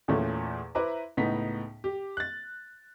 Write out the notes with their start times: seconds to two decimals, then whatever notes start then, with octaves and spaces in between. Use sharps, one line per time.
0.08 E2 A#2 A3 C#4
0.75 E4 B4 C5 E5 A#5 D6
1.17 C#2 A2 B3 D#4 B6
1.84 G4
2.17 F#6 A6